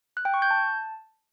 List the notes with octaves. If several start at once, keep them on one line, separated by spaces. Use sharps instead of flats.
F#6
G5
C#6
G6
A5